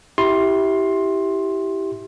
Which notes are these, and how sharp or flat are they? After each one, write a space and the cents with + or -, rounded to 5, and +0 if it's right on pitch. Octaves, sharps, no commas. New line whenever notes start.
E4 -10 G4 -15 C6 +15